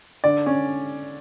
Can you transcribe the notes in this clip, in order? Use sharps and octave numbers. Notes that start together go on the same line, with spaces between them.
D3 D5
C#4